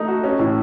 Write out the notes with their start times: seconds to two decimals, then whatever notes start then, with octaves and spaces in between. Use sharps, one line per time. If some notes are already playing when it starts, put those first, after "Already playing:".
Already playing: A3 D#4
0.08 F#4
0.23 C#4
0.39 A2